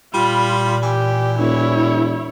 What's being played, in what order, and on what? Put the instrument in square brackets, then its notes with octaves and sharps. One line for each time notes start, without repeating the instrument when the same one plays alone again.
[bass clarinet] A#2 [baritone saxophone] G3 [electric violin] F4 B5
[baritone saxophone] E3 [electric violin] G4
[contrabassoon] E1 [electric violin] E4 C#5